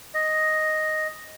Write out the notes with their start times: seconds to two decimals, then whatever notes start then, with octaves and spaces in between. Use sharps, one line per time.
0.14 D#5